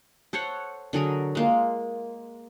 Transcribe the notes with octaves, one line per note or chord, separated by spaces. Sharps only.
A4 C5 C#5 F#5
D3 F#3 G#4 A#4
G#3 A#3 F4